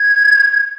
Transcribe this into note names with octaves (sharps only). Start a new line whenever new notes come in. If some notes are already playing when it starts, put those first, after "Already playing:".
Already playing: G#6